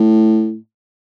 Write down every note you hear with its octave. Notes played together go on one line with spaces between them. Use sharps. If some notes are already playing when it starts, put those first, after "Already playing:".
Already playing: A2